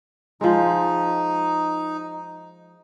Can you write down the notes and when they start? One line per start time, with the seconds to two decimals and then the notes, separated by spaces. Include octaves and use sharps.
0.41 F3 G#3 D#4